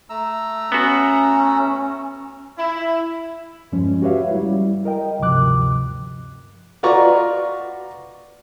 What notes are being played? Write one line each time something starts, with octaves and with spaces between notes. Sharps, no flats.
A3 A#5 E6
B3 C#4 F#4
E4
E2 G2 F3 G#3 C#4
F#4 G4 B4 C#5 E5 F5
G3 E4
A#4 D#5 G5
D2 G2 C3 F3 D6 F#6
F4 F#4 B4 D5 A#5 C#6